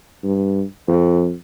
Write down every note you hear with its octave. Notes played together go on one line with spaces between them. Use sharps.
G2
F2